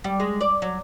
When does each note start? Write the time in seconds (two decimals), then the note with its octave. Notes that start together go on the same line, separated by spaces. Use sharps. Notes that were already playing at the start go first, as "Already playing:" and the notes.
0.04 G3
0.20 G#3
0.41 D5
0.62 F#3